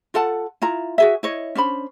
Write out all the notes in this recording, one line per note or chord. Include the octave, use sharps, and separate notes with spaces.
F4 A4 F#5 A5
E4 F4 A#5
F#4 G#4 E5
E4 C#5 D#5
C#4 D4 C5 B5